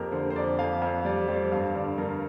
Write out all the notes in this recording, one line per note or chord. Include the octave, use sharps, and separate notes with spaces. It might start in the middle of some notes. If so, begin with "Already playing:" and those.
Already playing: F2 A#3 G4 A#4
D3 C5
C5
F2 D5
F2 F5
F2 F5
G3 D5
G3 C5
G2 F5
D3 D5
G2 A#4